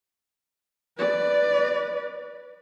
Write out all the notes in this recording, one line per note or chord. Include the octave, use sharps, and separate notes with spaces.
B4 D5